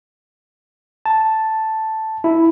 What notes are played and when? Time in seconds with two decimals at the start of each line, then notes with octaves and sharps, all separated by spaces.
1.06 A5
2.24 E4